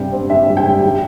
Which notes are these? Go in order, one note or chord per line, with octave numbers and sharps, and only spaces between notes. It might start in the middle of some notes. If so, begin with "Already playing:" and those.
Already playing: G2 C3 G3 G5
C4
G2 E5
G3
G5
G3
G3